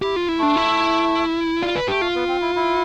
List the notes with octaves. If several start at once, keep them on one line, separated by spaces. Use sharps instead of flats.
E4 G4
F4
E4
A3 D4
E4
G3 F4
B4
A3 G4
F4
B3
C4
E4
E4